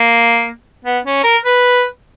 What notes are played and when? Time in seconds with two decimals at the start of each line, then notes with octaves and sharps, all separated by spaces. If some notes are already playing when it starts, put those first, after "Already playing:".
Already playing: A#3
0.85 B3
1.05 C#4
1.24 A#4
1.44 B4